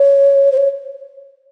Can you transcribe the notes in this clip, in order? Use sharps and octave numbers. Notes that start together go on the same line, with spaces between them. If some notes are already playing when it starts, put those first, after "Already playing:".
Already playing: C#5
C5
C#5